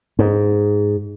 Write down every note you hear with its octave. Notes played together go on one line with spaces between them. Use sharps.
G#2